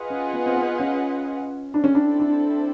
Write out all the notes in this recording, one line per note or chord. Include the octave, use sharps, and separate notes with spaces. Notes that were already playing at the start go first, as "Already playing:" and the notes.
Already playing: F4 G#4 B4 D#5 F#5
C#4
B3
C4
B3
C#4
C4 D4 E4 A4
C#4
D4
D4